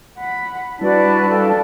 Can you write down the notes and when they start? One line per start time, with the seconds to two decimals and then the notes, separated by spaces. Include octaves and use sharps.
0.17 F#5 B5
0.81 G3 D4 E4 F#4 B4 D5 A5
1.30 A4 F5 G5